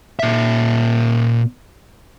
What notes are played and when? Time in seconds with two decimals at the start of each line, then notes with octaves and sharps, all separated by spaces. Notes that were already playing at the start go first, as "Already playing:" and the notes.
0.19 A#2 E5